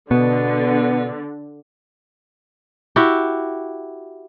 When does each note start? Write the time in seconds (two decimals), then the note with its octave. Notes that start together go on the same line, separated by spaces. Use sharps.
0.11 B2 D3 B3
2.96 E4 F#4 G4